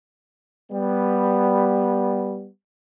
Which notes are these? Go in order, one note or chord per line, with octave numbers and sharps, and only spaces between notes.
G3 B3